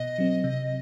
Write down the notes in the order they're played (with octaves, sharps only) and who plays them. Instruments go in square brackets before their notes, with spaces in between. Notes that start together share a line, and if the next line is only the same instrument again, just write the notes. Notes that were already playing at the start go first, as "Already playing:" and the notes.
Already playing: [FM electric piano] B2 [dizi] D#5
[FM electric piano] F#3 C4
C3